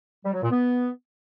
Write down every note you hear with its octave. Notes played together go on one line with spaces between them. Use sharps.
G3
F#3
A#2
B3